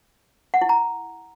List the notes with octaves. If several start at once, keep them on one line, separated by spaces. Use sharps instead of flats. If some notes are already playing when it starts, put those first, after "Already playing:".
F#5
E4
A#5